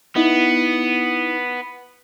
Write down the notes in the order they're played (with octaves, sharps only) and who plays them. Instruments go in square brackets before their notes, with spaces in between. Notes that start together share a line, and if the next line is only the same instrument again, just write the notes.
[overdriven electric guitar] B3 [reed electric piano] D#4 E4